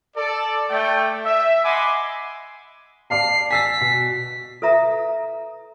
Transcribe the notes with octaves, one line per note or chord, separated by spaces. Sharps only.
A4 D5
A3 D5 G5
E5
D#5 F#5 G#5 B5 C6 D6
D5 F5 A5 C7
G#5 E6 A6 B6
B2
A4 B4 E5 A#5 D#6